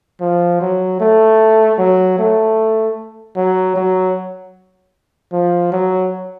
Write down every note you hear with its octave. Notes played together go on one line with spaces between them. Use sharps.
F3
F#3
A3
F#3
A3
F#3
F#3
F3
F#3